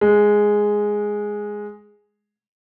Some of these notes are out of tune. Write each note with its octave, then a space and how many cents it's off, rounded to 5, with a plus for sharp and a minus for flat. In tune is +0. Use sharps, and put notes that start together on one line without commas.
G#3 +0